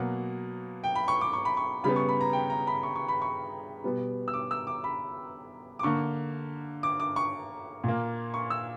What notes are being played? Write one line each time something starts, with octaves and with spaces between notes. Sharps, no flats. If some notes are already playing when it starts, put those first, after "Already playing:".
Already playing: B2 F#3 A#3 F#5
G5
B5
C#6
D6
C#6
B5
C#6
C#3 G3 B3 B5
C#6
B5
A#5
G5
A#5
B5
C#6
C#6
B5
C#6
B2 G3 B3
E6
D6
E6
D6
B5
D6
D3 A#3 C#6
D6
D6
C#6
A#2 A#3
C#6
E6